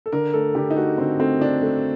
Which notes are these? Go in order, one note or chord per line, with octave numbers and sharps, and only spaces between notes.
A4
D3 A#4
A3 A4
D3 G4
D#4
A3 F#4
D3 C4
A3 C4
D3 D4
A3